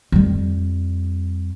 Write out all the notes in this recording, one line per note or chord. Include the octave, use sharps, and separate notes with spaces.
F2 G3